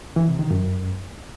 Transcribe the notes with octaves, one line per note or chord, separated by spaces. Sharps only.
E3
C3
D#3
F#2